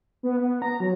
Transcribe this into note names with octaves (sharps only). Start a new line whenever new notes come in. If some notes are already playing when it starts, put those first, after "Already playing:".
B3
B3
A#5
F#3